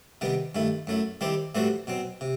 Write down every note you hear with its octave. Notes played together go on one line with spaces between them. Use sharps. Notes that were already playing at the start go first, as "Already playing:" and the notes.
C3 D#3 G3 B3
G2 D#3 A3 E4
F#2 F#3 A3 E4
D#3 G3 C4 E4 G4
A2 E3 G3 C4 F#4
B2 F#3 C4
C3